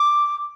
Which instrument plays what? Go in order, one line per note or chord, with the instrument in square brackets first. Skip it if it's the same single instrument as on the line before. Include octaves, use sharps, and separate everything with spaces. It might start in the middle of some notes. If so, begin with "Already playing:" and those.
Already playing: [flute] D6